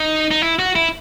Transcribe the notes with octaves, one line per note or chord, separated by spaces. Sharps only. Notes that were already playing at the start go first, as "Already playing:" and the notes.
Already playing: D#4
D#4
E4
F#4
E4